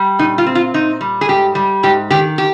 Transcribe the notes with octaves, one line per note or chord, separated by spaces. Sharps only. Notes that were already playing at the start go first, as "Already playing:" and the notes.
Already playing: G3
A#2 D#4
F4
C4
F4
A#2 D#4
G3
G#4
G#2 G4
G3
G#2 G4
D#3 G4
G4